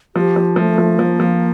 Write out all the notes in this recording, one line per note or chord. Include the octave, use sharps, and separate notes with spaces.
F3 G4
F3
F3 A3
F3
F3 A#3
F3